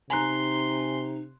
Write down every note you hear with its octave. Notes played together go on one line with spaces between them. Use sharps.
C3 D#4 G#5 A#5 C6 F#6